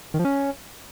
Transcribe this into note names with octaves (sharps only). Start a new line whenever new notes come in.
D#3
F3
C#4